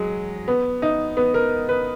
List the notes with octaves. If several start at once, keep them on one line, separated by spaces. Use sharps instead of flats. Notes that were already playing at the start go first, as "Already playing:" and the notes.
Already playing: F#3 G#3
B3
D#4
B3
A#4
B4